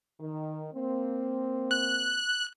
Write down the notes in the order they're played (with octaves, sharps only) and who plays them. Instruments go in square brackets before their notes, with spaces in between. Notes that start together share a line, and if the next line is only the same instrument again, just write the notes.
[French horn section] D#3
A#3 C4
[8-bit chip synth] F#6